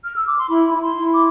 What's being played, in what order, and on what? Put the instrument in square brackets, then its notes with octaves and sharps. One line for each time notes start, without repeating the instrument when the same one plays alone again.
[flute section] F6
E6
D6
C6
E4 B5
E4 B5
C6
E4
D6